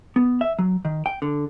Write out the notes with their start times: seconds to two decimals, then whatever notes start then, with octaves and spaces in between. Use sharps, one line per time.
0.16 B3
0.41 E5
0.59 F#3
0.85 D#3
1.06 G5
1.22 D3